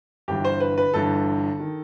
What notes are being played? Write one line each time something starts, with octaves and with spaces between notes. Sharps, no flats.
G1 G2 E3 G4
C5
B4
B4
G1 G2 E3 A4
D#3